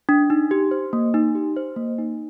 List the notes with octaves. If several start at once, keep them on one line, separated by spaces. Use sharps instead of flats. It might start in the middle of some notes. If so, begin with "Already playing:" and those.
D4
D#4
G4
C5
A#3
D#4
G4
C5
A#3
D#4